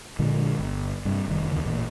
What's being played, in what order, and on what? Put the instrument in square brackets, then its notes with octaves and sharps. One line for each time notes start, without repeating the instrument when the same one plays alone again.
[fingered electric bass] A#1 A#2 D3 G#3
G1
G2 C3
F1 D#3
D#2 B2 D3 D#3
A1 A#2